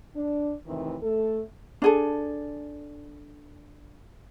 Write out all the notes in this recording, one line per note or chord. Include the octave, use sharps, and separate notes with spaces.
D4
F2 A2 C3 D#3 E3 C4
A3 A4
D4 G#4 A4